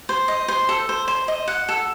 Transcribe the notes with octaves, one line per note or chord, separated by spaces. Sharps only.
C5
D#5
C5
A4
C5
C5
D#5
F#5
A4